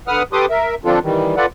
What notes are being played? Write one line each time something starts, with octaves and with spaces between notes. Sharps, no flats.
D3 B4 F#5 D#6 F6
G4 A4 B4 C6 D6 D#6
A#4 E5
D3 F3 C4 D4 F4 A4
D#3 E3 G3
F4 A4 B4 D5 F#5